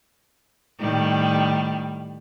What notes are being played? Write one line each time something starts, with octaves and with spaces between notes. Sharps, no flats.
A2 D#3 G3